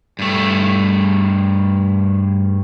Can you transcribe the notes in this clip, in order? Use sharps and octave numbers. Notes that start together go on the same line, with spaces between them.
G2 A3